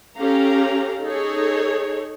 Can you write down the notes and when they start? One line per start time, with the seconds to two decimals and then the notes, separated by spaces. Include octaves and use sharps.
0.16 C#4 G4 A4 F5 A#5
1.02 D#4 G#4 A4 C#5